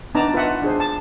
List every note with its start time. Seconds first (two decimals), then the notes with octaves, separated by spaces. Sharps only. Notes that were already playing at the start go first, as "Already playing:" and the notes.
0.15 B3 D4 D#4 D5 A5 A#5
0.34 F4 B4 D#5 E5 F#5
0.62 D4 G#4 C5
0.80 A5